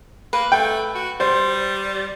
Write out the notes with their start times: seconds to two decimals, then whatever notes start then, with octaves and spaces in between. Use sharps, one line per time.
0.33 A#3 B4
0.52 A3 G5
0.95 F#4
1.20 G3 C5